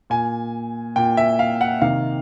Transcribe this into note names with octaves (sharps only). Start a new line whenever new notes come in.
A#2 G#5
A#2 G5
E5
F5
F#5
C3 D#3 F5